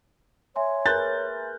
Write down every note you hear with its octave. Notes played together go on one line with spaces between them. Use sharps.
C#5 E5 G#5 C6
G#4 A#4 B4 F#6 G6 A6